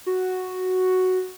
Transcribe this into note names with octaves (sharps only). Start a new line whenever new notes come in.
F#4